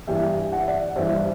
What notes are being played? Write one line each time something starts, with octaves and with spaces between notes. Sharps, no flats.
G2 E3 G3 E5 G5
F#5
E5
D5 F#5
G2 E3 G3 C5 E5